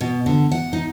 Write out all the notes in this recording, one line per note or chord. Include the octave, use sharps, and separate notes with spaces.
B2
D3
F#5
D#4